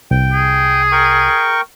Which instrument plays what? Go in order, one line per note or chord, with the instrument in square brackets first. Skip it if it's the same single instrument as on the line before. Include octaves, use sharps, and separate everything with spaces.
[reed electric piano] C2 [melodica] G5
[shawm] G#4
[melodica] A#4 G5 C#6